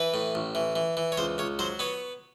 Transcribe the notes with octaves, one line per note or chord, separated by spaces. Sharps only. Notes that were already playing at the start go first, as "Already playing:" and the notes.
Already playing: E3 B4
A2
A1
E3
E3
E3
C#5
C#2 C5
C#2 C#5
F#3 C5
B3 C#5